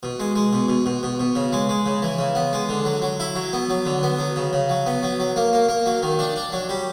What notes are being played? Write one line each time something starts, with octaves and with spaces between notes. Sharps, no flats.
B2
G#3
G#3
B2
B2
B2
B2
B2
C#3
G#3
G#3
C#3
E3
C#3
B3
G#3
D3
F#3
F#3
E4
F#3
B3
F#3
D3
B3
F#3
C#3
C#3
F#3
B3
F#3
F#3
A#3
A#3
A#3
F#3
D#3
D4
D4
F#3
G3